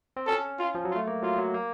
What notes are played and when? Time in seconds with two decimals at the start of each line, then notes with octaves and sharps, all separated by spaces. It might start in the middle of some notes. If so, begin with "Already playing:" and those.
0.17 C4
0.27 C#4 A4
0.59 F4
0.75 F3
0.85 F#3
0.91 F4
0.96 A3
1.07 A#3
1.23 F#3 F4
1.38 F#3
1.54 A#3